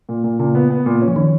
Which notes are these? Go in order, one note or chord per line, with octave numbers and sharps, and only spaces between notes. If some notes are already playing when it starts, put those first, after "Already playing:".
A#2
A#2
A#2 C#3
B3
B3
A#2
C#4
F3
D#3 C#4